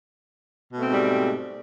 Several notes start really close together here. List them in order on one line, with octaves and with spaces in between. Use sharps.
B2 A3 C4 G#2 G3